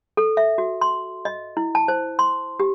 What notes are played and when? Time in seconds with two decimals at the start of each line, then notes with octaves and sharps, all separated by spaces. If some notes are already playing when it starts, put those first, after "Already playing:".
0.17 A4
0.37 E5
0.58 F#4
0.81 C6
1.25 D#5
1.57 E4
1.75 A5
1.88 C5
2.19 C6
2.60 G4